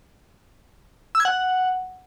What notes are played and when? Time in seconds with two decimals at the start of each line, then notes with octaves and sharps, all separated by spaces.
1.15 E6
1.20 G#6
1.25 F#5